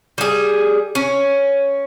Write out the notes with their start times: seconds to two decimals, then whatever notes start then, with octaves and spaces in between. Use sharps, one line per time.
0.18 G3 G#4
0.95 C#4